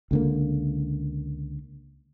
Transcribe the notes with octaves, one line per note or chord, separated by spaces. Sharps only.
C#2 D3 A#3